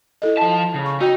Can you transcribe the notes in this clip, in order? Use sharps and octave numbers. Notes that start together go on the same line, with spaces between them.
E4 A4 D#5
F3 A5
C#3
C#6
D#4 F#4 G5